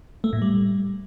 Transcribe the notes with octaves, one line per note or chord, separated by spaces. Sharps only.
A3
A2
G3